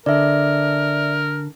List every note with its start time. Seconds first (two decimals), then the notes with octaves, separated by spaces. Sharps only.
0.06 D3 A#4 D5 E5